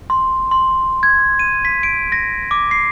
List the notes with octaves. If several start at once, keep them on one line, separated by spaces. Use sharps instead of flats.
C6
C6
G#6
D#7
B6
D7
A#6
D6
C7